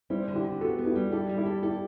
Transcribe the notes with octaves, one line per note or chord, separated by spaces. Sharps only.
G3 C4 E4
D3
E4 G4
D3
B3 F#4 A4
B3
E4 G4
G3
E4 G4 A4
G3
E4 G4
A4
E4 G4 A4